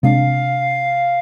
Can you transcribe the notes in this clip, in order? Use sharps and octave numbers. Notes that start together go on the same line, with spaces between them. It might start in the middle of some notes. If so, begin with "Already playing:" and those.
C3 G#3 D4 F5